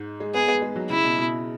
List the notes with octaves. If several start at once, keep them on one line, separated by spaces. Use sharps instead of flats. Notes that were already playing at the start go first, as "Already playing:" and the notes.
Already playing: G#2
G#3
B3 G#4
B3
G#3
F#3
C#3 E4
B2
B2